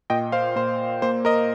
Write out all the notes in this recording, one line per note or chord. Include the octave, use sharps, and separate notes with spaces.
A#2 D#5 G5
C5 F5
A#2 C5
A#3 C5
A#4 D#5